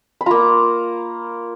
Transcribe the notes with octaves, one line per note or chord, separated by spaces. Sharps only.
B5
A#3 F4 A#5